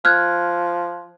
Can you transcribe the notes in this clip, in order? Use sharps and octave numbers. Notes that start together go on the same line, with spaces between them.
F3 F6 F#6 G#6